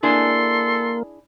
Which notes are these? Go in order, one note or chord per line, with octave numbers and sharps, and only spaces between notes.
A#3 D4 E4 G#4 A4 C6